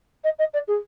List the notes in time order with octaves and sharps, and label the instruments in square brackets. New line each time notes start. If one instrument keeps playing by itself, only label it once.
[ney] D#5
D#5
D5
G#4